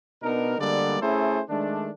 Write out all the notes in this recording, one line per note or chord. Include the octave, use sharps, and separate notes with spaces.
B2 B3 D4 D#4 A#4
D3 G3 G#3 A#3 B3 D5
A3 C#4 E4 G#4 A4 C5
D#3 G#3 A3 D4